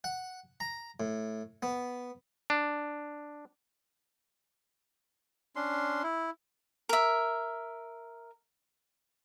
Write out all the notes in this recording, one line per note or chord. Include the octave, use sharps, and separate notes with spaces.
F#5
A#5
A2
B3
D4
C#4 D4 C6
E4
A#4 E5